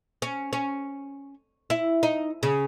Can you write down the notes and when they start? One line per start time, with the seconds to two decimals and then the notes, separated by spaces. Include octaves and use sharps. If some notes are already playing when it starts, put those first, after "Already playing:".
0.22 C#4
0.53 C#4
1.70 E4
2.03 D#4
2.43 C#3